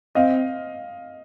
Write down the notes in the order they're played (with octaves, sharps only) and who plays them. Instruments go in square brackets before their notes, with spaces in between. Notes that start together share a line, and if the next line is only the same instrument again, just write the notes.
[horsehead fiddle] C4 [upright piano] D#5 F5